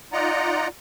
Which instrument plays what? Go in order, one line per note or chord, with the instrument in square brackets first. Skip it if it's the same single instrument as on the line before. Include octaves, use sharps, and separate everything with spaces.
[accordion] D#4 F4 D5 D#5 F#5 A#5